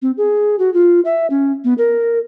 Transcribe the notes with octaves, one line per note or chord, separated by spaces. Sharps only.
C4
G#4
F#4
F4
E5
C#4
B3
A#4